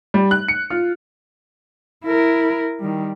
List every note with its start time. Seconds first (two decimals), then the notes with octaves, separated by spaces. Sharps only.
0.14 G3
0.31 F#6
0.48 C#7
0.70 F4
2.05 E4 A#4
2.80 D#3 G3